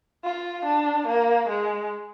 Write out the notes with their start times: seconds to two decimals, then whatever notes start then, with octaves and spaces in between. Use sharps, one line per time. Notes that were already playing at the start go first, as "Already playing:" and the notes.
0.24 F4
0.65 D4
1.07 A#3
1.49 G#3